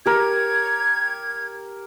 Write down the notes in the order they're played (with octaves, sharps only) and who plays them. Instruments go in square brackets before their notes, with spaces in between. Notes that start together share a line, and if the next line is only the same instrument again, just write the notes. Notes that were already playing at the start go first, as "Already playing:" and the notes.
[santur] G4 A#4 [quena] G#6